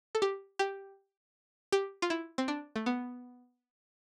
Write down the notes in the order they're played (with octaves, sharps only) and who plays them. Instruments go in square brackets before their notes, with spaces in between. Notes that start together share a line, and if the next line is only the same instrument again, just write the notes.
[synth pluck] A4
G4
G4
G4
F4
E4
C4
D4
A3
B3